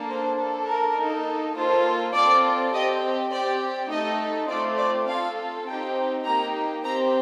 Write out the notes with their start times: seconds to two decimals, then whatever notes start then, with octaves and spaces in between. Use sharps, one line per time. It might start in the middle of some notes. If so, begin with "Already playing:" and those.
Already playing: A#3 D4 A4
0.09 C5
0.39 D4 A4
0.68 A#4
0.97 A#3 D#4 A4
1.56 A#3 F4 A4 C5
2.14 C4 F4 A4 D5
2.73 C4 G4 D#5
3.31 C4 G4 D5
3.90 A3 D#4 A4 D#5
4.49 A3 C4 F4 D5
4.78 D5
5.07 C4 F4 A4 F5
5.66 C4 D#4 G4 G5
6.24 A#3 D#4 G4 A#5
6.84 C4 G4 A#5